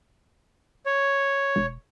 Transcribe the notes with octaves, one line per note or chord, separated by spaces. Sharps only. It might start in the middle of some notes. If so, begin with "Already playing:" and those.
C#5
E1